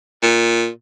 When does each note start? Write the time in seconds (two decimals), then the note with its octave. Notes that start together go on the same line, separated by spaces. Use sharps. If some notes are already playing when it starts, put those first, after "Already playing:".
0.23 A#2